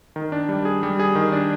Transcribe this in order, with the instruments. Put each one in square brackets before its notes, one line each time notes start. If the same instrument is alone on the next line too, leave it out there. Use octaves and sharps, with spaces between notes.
[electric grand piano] D#3
D4
G3
G#4
G3
G#4
D#3
D4